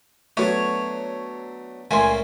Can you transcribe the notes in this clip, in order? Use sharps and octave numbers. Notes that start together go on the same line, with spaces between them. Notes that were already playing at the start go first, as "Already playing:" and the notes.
F#3 A3 B3 D4 C#5
C#2 A#2 A3 G#5 C6